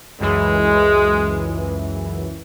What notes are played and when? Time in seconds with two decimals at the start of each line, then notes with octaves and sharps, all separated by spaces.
0.20 C#2 F#2 E3 G#3